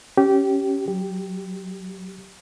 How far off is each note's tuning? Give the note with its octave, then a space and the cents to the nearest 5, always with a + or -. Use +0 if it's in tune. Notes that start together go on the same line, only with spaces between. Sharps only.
C#4 +0 G4 -20
F#3 +5 G4 +0